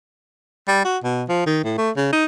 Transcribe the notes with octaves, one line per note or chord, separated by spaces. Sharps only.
G3
F#4
B2
F3
D#3
A2
A3
C#3
D#4